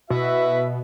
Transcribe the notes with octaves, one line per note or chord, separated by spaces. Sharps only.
B2 E4 F#4 B4 E5